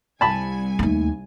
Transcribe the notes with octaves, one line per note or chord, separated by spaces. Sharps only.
C2 G#5 A5 B5
D#2 A3